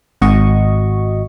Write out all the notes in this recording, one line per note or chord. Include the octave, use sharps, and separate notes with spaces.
G#1 F#4 D#5 C#6